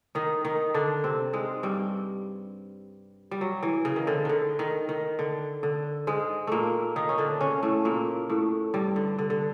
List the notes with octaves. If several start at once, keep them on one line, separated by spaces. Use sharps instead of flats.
D#3 D#4
D#3 D#4
D3 D4
C3 C4
G#2 G#3
G2 G3
G3
F#3
E3
C#3
D#3
D3
D3 D#3
D#3
D#3
D3
D3
G#2 G#3
A#2 A3 A#3
D#3 D#4
C#4
D3 D4
C#3 C#4
A2 A3
A#2 A#3
A2 A3
G2 G3
D3
D3
D3